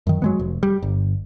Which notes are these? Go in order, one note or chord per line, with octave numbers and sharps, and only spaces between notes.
F#2 D#3
F#3 G#3 B3
F1
G3
G1